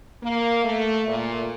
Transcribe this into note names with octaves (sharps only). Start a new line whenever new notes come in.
A#3
A3
A#2